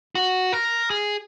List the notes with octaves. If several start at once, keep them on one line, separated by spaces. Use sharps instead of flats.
F#4
A#4
G#4